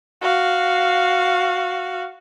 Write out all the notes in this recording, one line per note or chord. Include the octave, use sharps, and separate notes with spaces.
F#4 F5